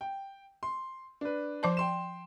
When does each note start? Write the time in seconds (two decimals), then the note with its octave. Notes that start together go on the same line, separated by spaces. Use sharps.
0.01 G5
0.63 C6
1.21 D4 B4
1.63 F3 C5 D5 A5
1.77 G5 C6 E7